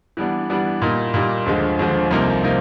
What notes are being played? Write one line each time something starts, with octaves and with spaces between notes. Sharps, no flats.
E3 G3 B3 D4
E3 G3 B3 D4
A#2 G3 A#3 D#4
A#2 G3 A#3 D#4
D#2 D3 F3 G#3
D#2 D3 F3 G#3
C2 C3 F3 A#3 D#4
C3 F3 A#3 D#4